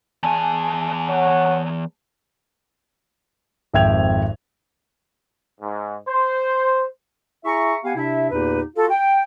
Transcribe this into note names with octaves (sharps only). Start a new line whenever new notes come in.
E2 G#4 G#5 A5
C#5 F#5
G#1 F2 E5 G5 G#6 F7
G#2
C5
E4 G#4 E5 A#5 C#6
B3 G4 F5 F#5 G#5
C3 D4 E4 E5
E2 A#2 A#3 D#4 G4 B4
F4 F#4 A4
G5